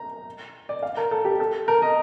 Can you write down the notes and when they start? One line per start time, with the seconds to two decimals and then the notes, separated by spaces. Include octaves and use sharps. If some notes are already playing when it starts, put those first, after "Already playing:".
Already playing: A#5
0.69 D5
0.83 F5
0.97 A#4
1.11 A4
1.25 G4
1.40 A4
1.68 A#4
1.82 D#5